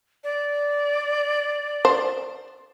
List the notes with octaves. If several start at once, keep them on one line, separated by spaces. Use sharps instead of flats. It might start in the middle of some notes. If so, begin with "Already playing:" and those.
D5
C5